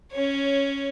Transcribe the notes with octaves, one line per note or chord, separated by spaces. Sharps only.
C#4 C#5